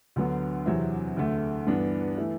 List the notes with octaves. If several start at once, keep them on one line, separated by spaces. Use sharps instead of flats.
D2 D3 F#3 B3
E2 C3 F#3 C4 E4
D2 D3 A3
G2 E3 B3 D4
E3 A3 E4